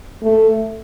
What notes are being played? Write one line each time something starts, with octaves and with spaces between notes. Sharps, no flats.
A3